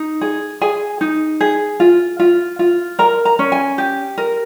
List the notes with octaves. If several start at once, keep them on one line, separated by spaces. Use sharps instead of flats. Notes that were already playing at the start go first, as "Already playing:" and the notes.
Already playing: D#4
G#4
G#4 G#5
D#4
G#4
F4
F4
F4
A#4 A#5
A#5
C#4
G#5
G4
A#4